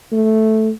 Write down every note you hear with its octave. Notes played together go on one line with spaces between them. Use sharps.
A3